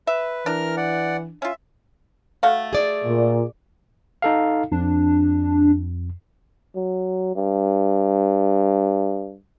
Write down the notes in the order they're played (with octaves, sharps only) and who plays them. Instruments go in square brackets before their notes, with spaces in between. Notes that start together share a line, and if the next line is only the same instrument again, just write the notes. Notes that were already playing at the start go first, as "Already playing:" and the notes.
[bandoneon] B4 [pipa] E5
[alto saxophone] E3 [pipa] D4 [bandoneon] A#4 F6
[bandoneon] D5 F#5
[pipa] C#4 F4 [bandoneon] E5
[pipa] A3 F#4 F5
[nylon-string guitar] G#4 D5
[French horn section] A#2
[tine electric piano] D#4 A4 F5
[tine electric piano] F2 [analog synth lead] D4
[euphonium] F#3
G2